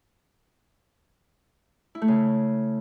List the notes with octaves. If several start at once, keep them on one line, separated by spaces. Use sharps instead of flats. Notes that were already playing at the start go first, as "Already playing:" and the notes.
E4
A3
C#3